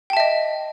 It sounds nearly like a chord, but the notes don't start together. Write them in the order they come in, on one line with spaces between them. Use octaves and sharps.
G5 A5 E5 D#5